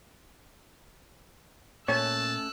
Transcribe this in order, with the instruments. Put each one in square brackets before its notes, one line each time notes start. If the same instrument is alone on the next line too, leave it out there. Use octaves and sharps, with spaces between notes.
[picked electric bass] A#2 [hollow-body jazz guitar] A3 C#4 C#5 [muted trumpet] A5 [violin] E6 F#6